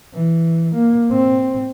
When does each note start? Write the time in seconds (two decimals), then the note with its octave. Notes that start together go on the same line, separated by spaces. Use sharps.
0.14 E3
0.75 A#3
1.12 C4